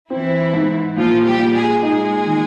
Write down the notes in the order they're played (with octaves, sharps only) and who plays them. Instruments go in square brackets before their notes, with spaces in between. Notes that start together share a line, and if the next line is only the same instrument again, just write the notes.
[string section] E3 E4 [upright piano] C4
[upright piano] G#2
[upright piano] A#2 [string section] F3 F4
[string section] G3 G4
[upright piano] A#2
[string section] G#3 G#4
[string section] G#3 G#4 [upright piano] D#4
[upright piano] D#3